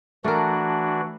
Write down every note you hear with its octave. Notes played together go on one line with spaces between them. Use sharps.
E3 A3 D4 F#4 A#4